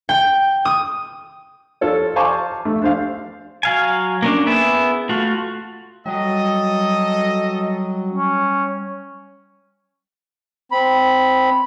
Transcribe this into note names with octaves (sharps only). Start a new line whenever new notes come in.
G5
D#6
F4 A4 C#5
C5 F5 G#5 A5 C#6 D6
A3
D4 C5 F5
F#3 F5 G#5
A#3 C#4 D4
B3 E4 G#4 E5 G5
A3 F4 F#4
F#3 G3 A4 D#5
C#4
C4 B5